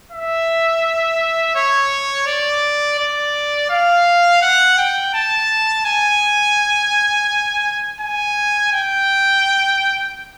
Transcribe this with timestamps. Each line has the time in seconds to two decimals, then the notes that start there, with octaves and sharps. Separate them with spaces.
0.12 E5
1.55 C#5
2.26 D5
2.98 D5
3.70 F5
4.42 F#5
4.78 G5
5.14 A5
5.86 G#5
8.01 G#5
8.72 G5